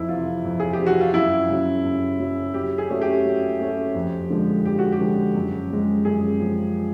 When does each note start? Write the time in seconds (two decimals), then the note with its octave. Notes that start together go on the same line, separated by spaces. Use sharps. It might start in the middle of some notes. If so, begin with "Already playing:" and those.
Already playing: F2 E4
0.09 C3 E3 F4
0.44 F2
0.60 G#4
0.73 G4
0.79 C3 E3
0.86 F#4
1.01 F4
1.13 F#2 E4
1.48 C#3 F#3
1.84 F#2
2.19 C#3 F#3
2.54 F#3 G4
2.78 G#4
2.90 A3 C#4 F#4
3.01 G4
3.25 F#3
3.59 A3 C#4 F#4
3.94 F2
4.30 D3 F3 G#3
4.65 F2 G4
4.79 F#4
4.92 G4
5.00 D3 F3 G#3
5.35 F#2
5.70 C#3 F3 G#3
6.05 F#2 G#4
6.40 C#3 F3